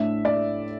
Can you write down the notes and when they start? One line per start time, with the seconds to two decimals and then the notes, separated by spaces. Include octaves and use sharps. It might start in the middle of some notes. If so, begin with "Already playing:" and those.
Already playing: A2 A3 D4 E5
0.25 D5